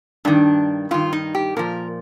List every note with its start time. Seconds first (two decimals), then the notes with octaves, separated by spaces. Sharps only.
0.25 G2 D#3 D4
0.91 G2 D#3 F4
1.13 D#4
1.35 G4
1.56 A#2 F3 A#4